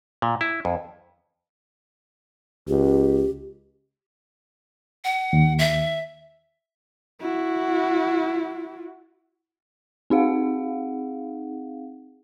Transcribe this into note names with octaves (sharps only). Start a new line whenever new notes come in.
A#2
E4
F2
C#2 G4
F#5
D#2
E5
E4 F#4
C4 D#4 G#4 F5 F#5